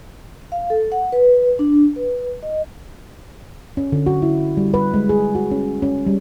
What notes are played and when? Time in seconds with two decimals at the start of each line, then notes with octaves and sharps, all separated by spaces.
0.52 F5
0.70 A4
0.92 F#5
1.12 B4
1.59 D4
1.96 B4
2.43 D#5
3.77 C#4
3.92 D3
4.06 F#4
4.22 E4
4.57 G3
4.74 B4
4.94 G#3
5.09 G#4
5.35 F#4
5.51 C#4
5.82 C#4
6.07 G3